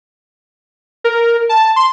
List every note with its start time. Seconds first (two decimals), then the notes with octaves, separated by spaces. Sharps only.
1.04 A#4
1.49 A5
1.76 C6